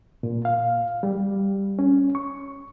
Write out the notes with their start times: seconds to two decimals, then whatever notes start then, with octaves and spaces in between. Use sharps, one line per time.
0.23 A#2
0.45 F5
1.03 G3
1.79 C#4
2.15 C#6